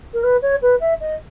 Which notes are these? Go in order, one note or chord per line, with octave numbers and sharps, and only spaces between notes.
A#4
B4
C#5
B4
E5
D#5